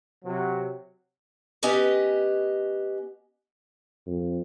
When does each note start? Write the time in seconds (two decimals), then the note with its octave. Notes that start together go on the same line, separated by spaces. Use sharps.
0.25 C3 F#3
1.63 B3 C#4 G4 B4 D#5 G#5
4.07 F2